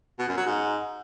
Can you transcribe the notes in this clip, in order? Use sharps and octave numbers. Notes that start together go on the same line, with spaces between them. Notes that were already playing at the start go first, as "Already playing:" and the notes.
B2
F#2
F#3
G#2